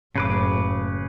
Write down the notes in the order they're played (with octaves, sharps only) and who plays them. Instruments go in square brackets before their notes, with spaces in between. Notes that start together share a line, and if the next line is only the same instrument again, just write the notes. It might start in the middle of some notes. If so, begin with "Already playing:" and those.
[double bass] F#1 A2 [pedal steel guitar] C#3 B4 D6